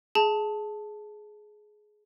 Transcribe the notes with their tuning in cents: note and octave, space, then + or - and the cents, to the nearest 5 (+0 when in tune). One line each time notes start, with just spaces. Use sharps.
G#4 +20 A5 +0